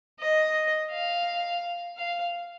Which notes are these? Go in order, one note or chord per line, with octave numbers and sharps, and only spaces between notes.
D#5
F5
F5